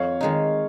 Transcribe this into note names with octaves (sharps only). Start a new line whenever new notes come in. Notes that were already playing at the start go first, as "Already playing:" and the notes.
Already playing: F2 C#5 F5
D#3 G#3 D#4